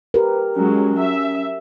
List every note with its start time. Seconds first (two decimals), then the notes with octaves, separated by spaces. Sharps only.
0.14 G4 A#4 B4
0.56 F#3 G#3 C#4
0.98 E5